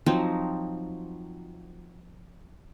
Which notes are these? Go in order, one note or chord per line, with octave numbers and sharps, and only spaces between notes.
F3 F#3 C4 D#4